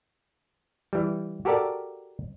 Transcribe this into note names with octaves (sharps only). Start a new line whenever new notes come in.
E3 G3
F#4 G4 A4 A#4 D5 A5